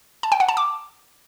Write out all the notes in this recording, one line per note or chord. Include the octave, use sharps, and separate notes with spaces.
A5
G5
F#5
A5
D6